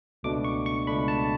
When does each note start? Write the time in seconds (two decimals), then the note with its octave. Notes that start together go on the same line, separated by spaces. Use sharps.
0.23 C#2 B2 A3 D4 D6
0.44 C#6
0.66 C#6
0.87 C#2 B2 A3 D4 B5
1.08 A5